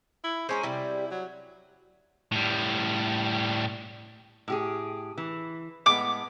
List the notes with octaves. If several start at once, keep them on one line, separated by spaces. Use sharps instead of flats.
E4
G#3 C#4 A#4 C5
C3 G3 E4
F#3
A2 G3
A2 G4 G#4
E3
A2 G#3 B3 D6